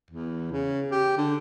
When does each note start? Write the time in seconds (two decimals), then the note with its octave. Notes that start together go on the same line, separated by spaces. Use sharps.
0.11 E2
0.52 C#3
0.92 G4
1.17 D3